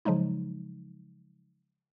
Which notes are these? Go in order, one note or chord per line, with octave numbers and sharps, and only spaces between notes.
C#3 F3 F#3 G#3 D#4